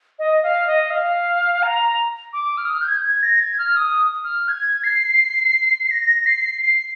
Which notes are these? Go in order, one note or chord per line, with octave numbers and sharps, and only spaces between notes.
D#5
F5
D#5
F5
A#5
D6
F6
D#6
F6
G6
G#6
G6
G#6
A#6
G#6
F6
D#6
F6
G#6
C7
A#6
C7
C7